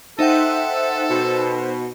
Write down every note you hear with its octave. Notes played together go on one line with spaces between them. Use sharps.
D#4 A4 C5 E5 F#5 G5
B2 C5